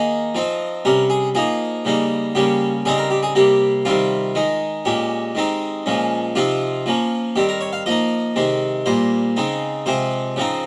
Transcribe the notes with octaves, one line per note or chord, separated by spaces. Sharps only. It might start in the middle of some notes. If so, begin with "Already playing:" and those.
Already playing: D#3 A#3 D#4 G#4
F3 C4 D#4
C3 G3 C#4 A#4
G#4
F3 A#3 D#4 G#4
C#3 G3 A#3 D#4
C#3 G3 A#3 C#4 G4
C#3 G3 C4 D#4 G#4
A#4
G4
G#4
C3 G3 A#3 G4
C3 D#3 G3 C4 F4
D#3 G#3 D#4
A#2 G#3 C#4 G4
D#3 G#3 C4 D#4
A#2 F3 G#3 C#4
C3 F3 C4 D#4 F4
F3 A#3 C#4
D#3 G3 C4 G4
A#4
C#5
F5
F3 A#3 D#4 D#5
C3 D#3 G#3 C4
A#2 G3 A#3 C5
C#3 G#3 C4 D#4
C3 F3 G#3 C4 C5
C#3 F3 C4 D#4